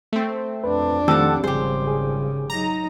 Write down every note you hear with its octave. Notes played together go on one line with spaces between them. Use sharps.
A3 C4
F2 D4 B4
D#3 F3 G3 A3 C4 A4 F#5
G#1 C#3 G4 G#4 C5
G#4
F#3 D#4 A#5